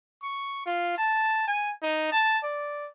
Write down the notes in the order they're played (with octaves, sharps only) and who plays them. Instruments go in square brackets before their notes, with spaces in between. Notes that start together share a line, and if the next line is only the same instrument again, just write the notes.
[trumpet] C#6
F4
A5
G#5
D#4
A5
D5